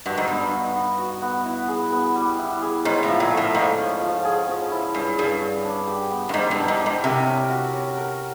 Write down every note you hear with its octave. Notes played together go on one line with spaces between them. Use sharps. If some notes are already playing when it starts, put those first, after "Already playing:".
G2 F#4
G#2
G2 B3
D#4
B3
F#4
B3
E4
G#4
B3
G3
E4
G#4
G#2 C#4
A2
F3
A#2
A3
A2
G#2 F3
C#4
F3
G#4
C#4
E4
G2 C#4
G2 G#4
C#4
D4
G4
B3
G2
G#2 G3
G2
D4
G#2
G4
G#2
C3 A#4
C#4
F#4
C#4
A#4